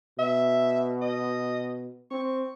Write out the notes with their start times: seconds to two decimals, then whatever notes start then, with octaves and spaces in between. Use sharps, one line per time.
0.19 B2 E5
1.02 D#5
2.11 C4 C#6